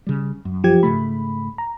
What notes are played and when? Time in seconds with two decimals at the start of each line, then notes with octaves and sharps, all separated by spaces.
0.07 C#3 G3
0.45 F#2
0.64 F3 G4 G#6
0.83 G#2 C#3 A3 B5
1.58 A#5